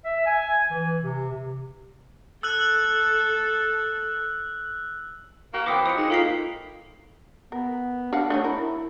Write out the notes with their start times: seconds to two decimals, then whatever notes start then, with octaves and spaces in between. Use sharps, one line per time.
0.05 E5
0.26 G#5
0.70 E3
1.02 C3
2.43 A4 E6 F#6 F#7
5.53 A#3 F#4
5.66 E3 C4 B5 D6 D#6
5.86 F3 D#5 D#6 C#7
5.97 G#3 D#4 D#5
6.10 A#3 F4 A4 B6 C7
7.52 B3 A#4
8.13 D4 A#4 F5 F#5
8.30 A3 D4 D#4 C#5
8.44 E4 A#4